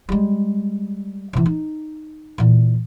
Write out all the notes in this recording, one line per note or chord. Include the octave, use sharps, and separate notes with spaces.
G3 G#3
C3 E3
D#4
A#2 E3